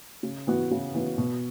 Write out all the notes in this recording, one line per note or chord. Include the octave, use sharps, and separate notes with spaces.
C#3
E3 B3 F#4
C#3
E3 B3 F#4
B2